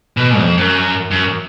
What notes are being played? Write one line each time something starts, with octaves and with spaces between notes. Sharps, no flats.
B2
F2
F#2
F#2